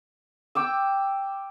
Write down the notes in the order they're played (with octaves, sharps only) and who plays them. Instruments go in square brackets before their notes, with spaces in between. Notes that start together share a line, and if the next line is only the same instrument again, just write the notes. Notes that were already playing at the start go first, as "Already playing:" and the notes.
[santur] G5 D6 E6